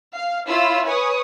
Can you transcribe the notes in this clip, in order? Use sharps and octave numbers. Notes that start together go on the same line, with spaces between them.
F5
E4 F4 C#5 B5 E6
B4 C#5 G#5 C#6 D#6